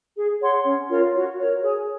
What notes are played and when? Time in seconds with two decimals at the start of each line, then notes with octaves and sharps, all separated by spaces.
0.16 G#4
0.41 C#5 F#5 C6
0.65 C#4
0.90 F4 A#4 C#5
1.15 F#4
1.39 A#4 C#5
1.62 G#4